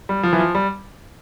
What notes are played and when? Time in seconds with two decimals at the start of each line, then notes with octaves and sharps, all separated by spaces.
0.09 G3
0.23 F3
0.33 E3
0.39 F3
0.55 G3